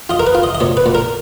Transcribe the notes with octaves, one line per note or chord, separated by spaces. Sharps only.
F4 D#5
A#4
B4
F4
D#5
D#5
A#2 C#5
B4
A#2
A#4